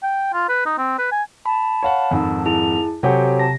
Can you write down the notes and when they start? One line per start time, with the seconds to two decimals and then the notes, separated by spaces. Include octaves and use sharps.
0.03 G5
0.33 F4
0.49 B4
0.66 D#4
0.78 C4
0.99 B4
1.12 G#5
1.46 A5 B5
1.83 C#5 F5 F#5
2.11 F2 G#2 D#3
2.46 E4 G#4 A5 F7
3.03 C3 F#3 C4 G4 A4 C#5 F#5 G#5
3.39 A5 A#6